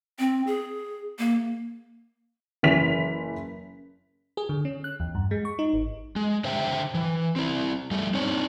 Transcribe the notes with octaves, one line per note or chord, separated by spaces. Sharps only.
C4
G#4
A#3
F#1 E3 B6 F7
G#4
D3
C#4
F#6
E2
G2
G#3
C#6
D#4
G#1
G#3
D3 C5 E5 G5
E3
C4 E4
G3 A3
C4 D4 D#4 C#5